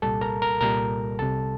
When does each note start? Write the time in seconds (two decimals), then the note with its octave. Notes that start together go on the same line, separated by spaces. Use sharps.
0.02 C2 A#2 G3 A4 A5
0.21 A#4 A#5
0.42 A#4 A#5
0.60 C2 A#2 G3 A#4 A#5
1.19 C2 C3 G3 A4 A5